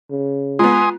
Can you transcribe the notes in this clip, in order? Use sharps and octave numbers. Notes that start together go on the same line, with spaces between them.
C#3
G#3 B3 F4 G#5 C6 D#6